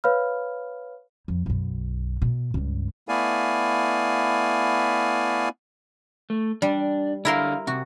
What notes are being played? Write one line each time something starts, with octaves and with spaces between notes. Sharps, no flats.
B4 C#5 F5 B5 F6
F2
B1 F#2
B2
C#2 G2
A3 B3 E4 D5 F5 G#5
A3
G3 D4
D3 E4 A#4 F5 C6
C3 F#4